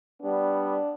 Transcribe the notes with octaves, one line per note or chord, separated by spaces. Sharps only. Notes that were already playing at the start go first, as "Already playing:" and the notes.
G3 B3 D4